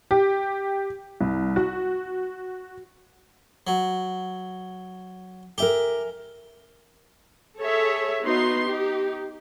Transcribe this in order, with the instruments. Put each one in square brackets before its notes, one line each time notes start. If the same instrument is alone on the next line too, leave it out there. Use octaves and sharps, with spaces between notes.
[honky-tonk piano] G4
C2
F#4
[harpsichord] F#3
[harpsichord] G4 [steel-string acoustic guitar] A#4 E5 G#5
[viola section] G#4 A4 C#5 E5
B3 D#4 F#4 C6
D#4 G4